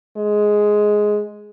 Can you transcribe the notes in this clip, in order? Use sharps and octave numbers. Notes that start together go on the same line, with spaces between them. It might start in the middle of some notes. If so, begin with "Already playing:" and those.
G#3